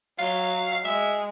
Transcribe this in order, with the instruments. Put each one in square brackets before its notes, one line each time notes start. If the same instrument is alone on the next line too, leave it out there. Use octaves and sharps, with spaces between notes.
[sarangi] F#3 [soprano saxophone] F5
[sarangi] G#3 [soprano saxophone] E5